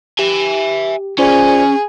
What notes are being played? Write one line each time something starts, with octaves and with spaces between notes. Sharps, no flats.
G4 E5 G#5
C#4 F4 G#4 C5 D5